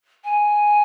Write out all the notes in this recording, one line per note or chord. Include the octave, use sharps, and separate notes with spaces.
G#5